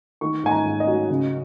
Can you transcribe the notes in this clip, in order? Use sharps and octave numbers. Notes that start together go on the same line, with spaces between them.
D#3 C#6
G#2 G#5
A#5
G#2
D#5
F#3
C#3